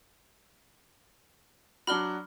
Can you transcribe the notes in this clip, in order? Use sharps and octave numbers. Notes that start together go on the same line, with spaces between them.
F#3 D4 F#4 B5 F6 G7